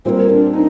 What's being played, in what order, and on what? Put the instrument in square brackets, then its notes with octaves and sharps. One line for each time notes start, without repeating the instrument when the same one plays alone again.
[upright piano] A#2 G3 C4 [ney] A#4 C5
[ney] D4
D#4